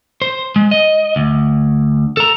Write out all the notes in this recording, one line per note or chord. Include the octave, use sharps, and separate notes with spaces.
C5
G#3
D#5
D2
A4 A#5